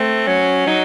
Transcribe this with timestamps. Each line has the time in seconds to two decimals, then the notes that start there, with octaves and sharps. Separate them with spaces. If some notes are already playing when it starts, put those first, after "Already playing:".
Already playing: A3 C4
0.27 F#3 C#4
0.67 F#3 D#4